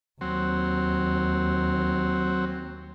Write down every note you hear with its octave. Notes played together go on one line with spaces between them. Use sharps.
D#2 F#3 C4